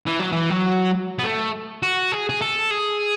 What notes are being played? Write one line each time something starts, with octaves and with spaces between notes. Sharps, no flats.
E3
F#3
E3
F#3
B3
A3
F#4
G#4
G#4
A4
G#4